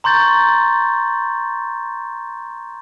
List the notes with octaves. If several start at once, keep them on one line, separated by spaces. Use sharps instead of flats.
A#5 C6 C#6 G6 A6